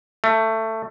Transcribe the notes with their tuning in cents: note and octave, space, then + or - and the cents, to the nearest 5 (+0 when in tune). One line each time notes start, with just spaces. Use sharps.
A3 +15